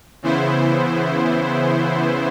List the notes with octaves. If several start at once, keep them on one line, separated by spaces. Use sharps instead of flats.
C#3 E3 B3 E4 C5